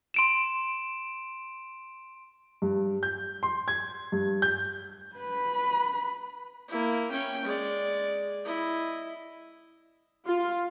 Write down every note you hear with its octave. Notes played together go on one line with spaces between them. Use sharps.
C6 D7 E7
G2
G6
C6
G#6
G2
G6
B4 B5
A#3 E4
C#4 G5
G#3 D5
E4 D#5
F4